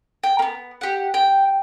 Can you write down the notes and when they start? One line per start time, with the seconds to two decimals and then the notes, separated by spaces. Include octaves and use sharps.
0.24 G5
0.39 A#3 B3
0.81 G4 F#5
1.14 G5